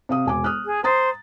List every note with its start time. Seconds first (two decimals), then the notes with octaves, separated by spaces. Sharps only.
0.09 C3 F5 D#6
0.26 E1 G#5 D6
0.44 D#6 F6 F#6
0.65 G#4
0.84 C5 A#5 D#6 A6